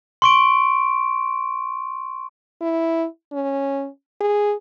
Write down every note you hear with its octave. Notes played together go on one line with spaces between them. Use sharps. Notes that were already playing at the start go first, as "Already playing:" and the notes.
C6 C#6 D7
E4
C#4
G#4